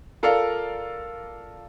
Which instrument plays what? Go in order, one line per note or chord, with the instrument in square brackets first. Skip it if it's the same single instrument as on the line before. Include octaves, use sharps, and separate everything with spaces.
[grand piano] F4 A4 A#4 D5 F5